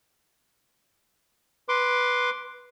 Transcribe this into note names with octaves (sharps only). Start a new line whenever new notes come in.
B4 C6 D6